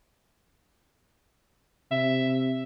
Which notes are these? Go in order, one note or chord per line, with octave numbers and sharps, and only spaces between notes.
C3 E5